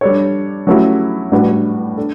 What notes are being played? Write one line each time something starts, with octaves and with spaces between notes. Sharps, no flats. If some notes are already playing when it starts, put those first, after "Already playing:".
G3 D4 A4 C#5
F#3 A3 C#4 E4 G4
A2 G3 D4 F#4 B4
D4 A4